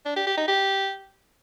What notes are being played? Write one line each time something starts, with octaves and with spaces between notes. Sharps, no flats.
D4
G4
G4
D#4
G4